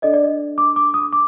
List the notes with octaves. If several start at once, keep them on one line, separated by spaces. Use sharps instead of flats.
D4 A4 D5 D#5
D5
D#5
D6
D6
D#6
D6